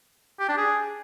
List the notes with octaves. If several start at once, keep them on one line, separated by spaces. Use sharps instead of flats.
G4
D4
G#4